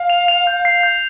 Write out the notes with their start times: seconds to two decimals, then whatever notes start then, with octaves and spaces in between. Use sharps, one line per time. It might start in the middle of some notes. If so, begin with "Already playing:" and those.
Already playing: F5
0.10 F7
0.28 F7
0.47 G6
0.65 C7
0.83 G6